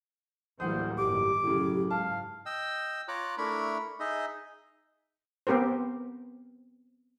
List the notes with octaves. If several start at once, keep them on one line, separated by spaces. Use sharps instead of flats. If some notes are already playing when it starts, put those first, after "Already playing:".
D1 E3 G3 A#3 C5 F#5 D#6
G1 D#3 G4 D6
F#2 A2 C#3
G#2 F5 A5
D#5 G5 E6
F4 C#5 A#5 D6 F#6
A3 D4 E4 A#4 B5 C#6
D#4 G#4 D#5 E5
B3 C4 G4 A#4 C5